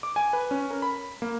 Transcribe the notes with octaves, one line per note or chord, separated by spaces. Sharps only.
D6
G#5
B4
C#4
A#4
B5
A#3